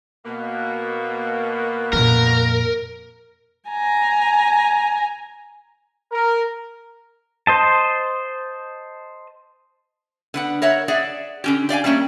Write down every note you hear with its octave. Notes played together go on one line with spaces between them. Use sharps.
B2 A#3
F2 A#2 A#4
G#5 A#5
A#4
C5 D#5 A5
D3 B3 F#5
A#4 C#5 E5 F#5
G#4 D5 E5 F#5
D3 C#4 G4
G4 D5 F5 G#5
G3 A3 A#3 C#4 D4